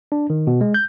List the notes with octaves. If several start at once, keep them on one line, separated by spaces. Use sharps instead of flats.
D4
D#3
B2
G#3
G6